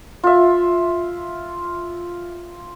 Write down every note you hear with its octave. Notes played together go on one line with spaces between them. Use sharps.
F4 E5